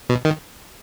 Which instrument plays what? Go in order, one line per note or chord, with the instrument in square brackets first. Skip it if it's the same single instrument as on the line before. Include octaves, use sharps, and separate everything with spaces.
[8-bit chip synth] B2
D#3